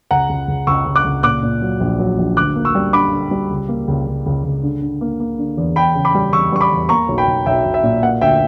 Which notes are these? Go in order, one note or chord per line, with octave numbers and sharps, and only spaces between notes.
C#2 F#5 A#5
C#2
C#2
C#2 C#6 E6
C#2
D6 F#6
C#2
A#2 D6 F#6
A#2
F#3
A#1
F#3
A#1
D2 D6 F#6
A#3
C#6 E6
G3
D3 B5 D6
D3
G3
C#2
A#3
C#2
C#2
C#2
C#2
D3
D3
A#3
A#3
D3
E2
E2 G5 B5
C#3
B5 D6
G3
E2 C#6 E6
G3 C#6
B5 D6
E2
A#3 A#5 C#6
B1
G5 B5
B1
B1 E5 G5
B1
E5
A#2
A#3 F#5
D2 E5 G5